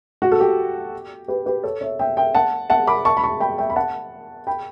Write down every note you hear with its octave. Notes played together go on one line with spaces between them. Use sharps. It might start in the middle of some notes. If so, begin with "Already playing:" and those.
F#4
A4
G4
G4 B4
G4 B4
A4 C#5
C#5 E5
E5 G5
E5 G5
F#5 A5
F#5 A5
B5 D6
A5 C#6
B5
A5 C#6
G5 B5
E5 G5
B5
F#5 A5
G5 B5